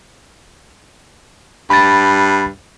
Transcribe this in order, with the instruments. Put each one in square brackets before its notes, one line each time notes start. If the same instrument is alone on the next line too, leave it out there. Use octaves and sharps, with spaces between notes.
[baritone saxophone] G2 [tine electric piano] B5 A6